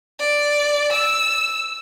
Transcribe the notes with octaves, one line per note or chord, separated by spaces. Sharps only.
D5
E6